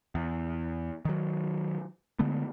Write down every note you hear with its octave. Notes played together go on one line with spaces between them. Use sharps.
E2
D#3 F#3
D3 G#3 A3 B3